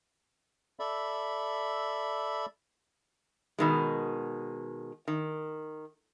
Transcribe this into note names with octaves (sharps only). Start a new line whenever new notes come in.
A4 D5 E5 B5
B2 D#3 G#3
D#3